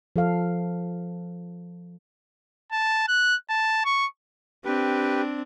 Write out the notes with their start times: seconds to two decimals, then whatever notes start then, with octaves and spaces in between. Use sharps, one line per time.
0.16 F3 A4 F5
2.72 A5
3.08 F#6
3.50 A5
3.85 C#6
4.65 C4 D4 G4 B4